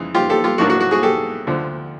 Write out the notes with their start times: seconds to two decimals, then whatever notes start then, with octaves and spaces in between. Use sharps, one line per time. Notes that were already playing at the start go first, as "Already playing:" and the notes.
Already playing: F2 C#3 E3 G#3
0.15 F4 G4
0.30 G4 A4
0.44 F4 G4
0.58 A#1 A2 F#3 A#3 D4 F#4
0.70 F#4
0.80 F#4
0.91 F#4 G#4
1.03 G4 A4
1.47 D2 D3 F3